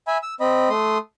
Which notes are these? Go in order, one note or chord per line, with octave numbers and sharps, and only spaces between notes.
E5 G#5 B5
E6
C4 D#5 B5
A3 C6 D#6